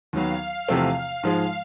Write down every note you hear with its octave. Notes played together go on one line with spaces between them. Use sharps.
D#2 D#3 F#3 B3 F5
E2 C3 F3 A3 C4
G#2 F3 G#3